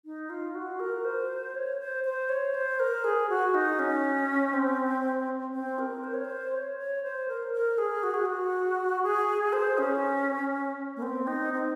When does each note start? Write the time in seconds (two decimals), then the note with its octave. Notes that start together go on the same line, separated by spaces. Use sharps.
0.05 D#4
0.30 F4
0.55 F#4
0.80 A#4
1.04 C5
1.55 C#5
1.80 C5
2.04 C5
2.29 C#5
2.54 C5
2.79 A#4
3.04 G#4
3.29 F#4
3.54 D#4
3.79 C#4
4.53 C4
5.54 C4
5.79 A#4
6.04 C5
6.14 C#5
6.24 C5
6.53 C#5
6.78 C#5
7.03 C5
7.28 A#4
7.53 A#4
7.78 G#4
8.03 F#4
8.14 G#4
8.25 F#4
9.03 G#4
9.53 C5
9.78 C#4
10.96 A#3
11.02 C4
11.27 D#4
11.52 C4